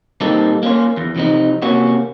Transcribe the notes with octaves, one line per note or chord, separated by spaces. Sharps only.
A#2 G3 A#3 C4 D#4 A4
A#3 C#4 F4
E2
C3 F3 D#4
C3 A#3 C#4 F#4